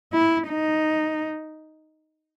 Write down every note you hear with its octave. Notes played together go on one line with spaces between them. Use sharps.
E4
D#4